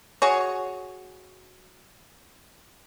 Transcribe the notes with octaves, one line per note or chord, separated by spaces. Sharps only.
F#4 G#4 C#5